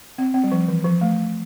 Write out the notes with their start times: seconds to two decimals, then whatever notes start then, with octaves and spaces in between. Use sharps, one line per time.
0.18 C4
0.34 C4
0.44 G3
0.52 F3
0.68 E3
0.84 F3
1.01 A3